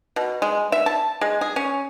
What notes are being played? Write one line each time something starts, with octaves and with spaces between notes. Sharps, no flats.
B2
G#3
E5
A5
G#3
G#4
C#4